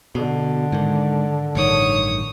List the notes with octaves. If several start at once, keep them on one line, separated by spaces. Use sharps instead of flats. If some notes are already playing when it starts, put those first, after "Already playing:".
B2 D3
G#2 D#3
A1 G2 D#3 C#5 D#6